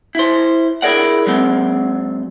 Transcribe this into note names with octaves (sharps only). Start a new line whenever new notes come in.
E4 C5
E4 G#4 A#4 D5 F#5
F#3 G#3 C4